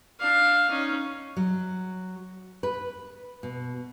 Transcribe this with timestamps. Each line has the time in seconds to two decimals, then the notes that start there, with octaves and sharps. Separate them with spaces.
0.20 D4 F5
0.70 C#4 D#4
1.37 F#3
2.63 B4
3.43 B2